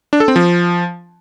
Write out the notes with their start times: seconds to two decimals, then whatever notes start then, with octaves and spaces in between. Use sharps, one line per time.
0.13 D4
0.20 A4
0.28 C4
0.36 F3